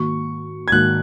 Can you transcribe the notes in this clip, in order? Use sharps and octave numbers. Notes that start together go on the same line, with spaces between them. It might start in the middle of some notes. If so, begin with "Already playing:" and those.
Already playing: G#2 D#3 A#3 F#4 C#6
G#6
G#2 D#3 A#3 F#4 F#6